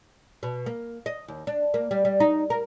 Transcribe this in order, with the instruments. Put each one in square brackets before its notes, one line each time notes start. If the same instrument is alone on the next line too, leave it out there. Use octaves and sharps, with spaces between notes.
[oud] B2
A#3
D#5
D#2
D4
A#3
G3
G3
D#4
A#4